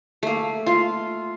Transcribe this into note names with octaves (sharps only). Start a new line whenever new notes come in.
A3 A#3
F4